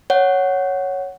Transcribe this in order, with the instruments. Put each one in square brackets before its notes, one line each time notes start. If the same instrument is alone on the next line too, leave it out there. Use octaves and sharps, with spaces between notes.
[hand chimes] C#5 F#5